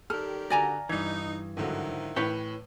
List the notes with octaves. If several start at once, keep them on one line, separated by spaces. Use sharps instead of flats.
D#3 G3 G4 A4 F6
D3 F#4 D5 G#5 A#5 A#6
G2 E3 D#4 D#6 G#6
G#2 D3 D#3 F3 F#3 E4
A2 E3 B4 C#5 G5